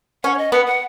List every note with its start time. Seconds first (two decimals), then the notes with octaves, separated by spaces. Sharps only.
0.24 C#4 F#5
0.34 C#5
0.38 D#5
0.52 B3 F#5
0.66 F#5